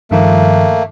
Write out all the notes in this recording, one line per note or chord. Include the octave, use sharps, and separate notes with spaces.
G2 D#3 F3 A3 A#3